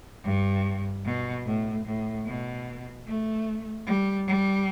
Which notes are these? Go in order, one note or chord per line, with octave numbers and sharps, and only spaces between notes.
G2
B2
A2
A2
B2
A3
G3
G3